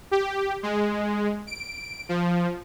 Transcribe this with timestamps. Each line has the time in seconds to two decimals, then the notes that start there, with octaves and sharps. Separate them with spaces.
0.11 G4
0.63 G#3
1.47 D7
2.09 F3